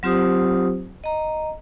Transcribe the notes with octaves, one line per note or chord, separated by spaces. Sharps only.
F#3 C4 F4 G4 C5 D#6
D#5 A#5